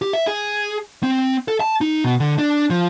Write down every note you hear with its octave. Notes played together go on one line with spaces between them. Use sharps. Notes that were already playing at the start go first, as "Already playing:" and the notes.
G4
E5
G#4
C4
A4
A5
D#4
B2
D3
D4
F3